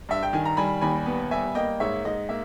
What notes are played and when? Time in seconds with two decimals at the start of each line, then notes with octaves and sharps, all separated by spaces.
0.09 G2 E5
0.23 G5
0.33 D#3 G#5
0.45 A#5
0.57 G3 G#5 B5
0.81 D#2 G#5 B5
1.06 B3
1.31 G3 E5 G#5
1.55 A#3 D#5 G5
1.80 G#2 C#5 E5
2.05 G#2 D#5
2.29 A#3 E5